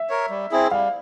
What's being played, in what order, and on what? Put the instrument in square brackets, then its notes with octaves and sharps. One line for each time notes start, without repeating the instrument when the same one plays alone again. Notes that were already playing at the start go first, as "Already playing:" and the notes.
Already playing: [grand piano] E5
[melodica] A#4 C#5
G3
C4 E4 G#4
[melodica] G3 [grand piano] F5